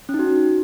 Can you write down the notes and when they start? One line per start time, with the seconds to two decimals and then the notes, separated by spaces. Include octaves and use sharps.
0.09 C#4
0.14 D#4
0.19 F#4